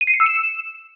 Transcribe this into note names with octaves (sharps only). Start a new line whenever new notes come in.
D#7
C7
C#7
E6
E7